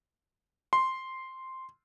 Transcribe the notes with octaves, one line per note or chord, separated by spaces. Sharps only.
C6